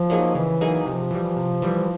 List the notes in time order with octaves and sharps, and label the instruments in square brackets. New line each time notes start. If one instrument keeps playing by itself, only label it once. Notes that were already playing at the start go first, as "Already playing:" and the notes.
Already playing: [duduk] F3
[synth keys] F#3 A#3 D#4 G#4
[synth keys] C#3 [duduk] E3
[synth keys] F#3 A#3 D#4 G#4
[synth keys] C3 [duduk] F3
[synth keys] E3 G3
C3
E3 G3